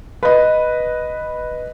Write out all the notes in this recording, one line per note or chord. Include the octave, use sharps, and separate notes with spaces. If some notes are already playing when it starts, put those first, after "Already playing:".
B4 D#5